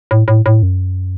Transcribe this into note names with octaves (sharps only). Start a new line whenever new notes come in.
A2
A2
A2
F#2